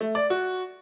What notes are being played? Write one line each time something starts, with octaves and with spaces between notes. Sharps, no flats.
A3
D5
F#4